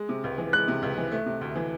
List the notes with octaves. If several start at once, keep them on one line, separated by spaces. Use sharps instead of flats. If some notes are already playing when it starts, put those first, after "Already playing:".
Already playing: G#3
C3
C#2
E3
G#3 F#6
C3
C#2
E3
A3
C3
D2
E3